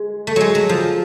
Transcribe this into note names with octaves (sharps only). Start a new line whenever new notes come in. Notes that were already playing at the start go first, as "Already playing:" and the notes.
Already playing: G#3
A3
F#3 G#3
F#3
F3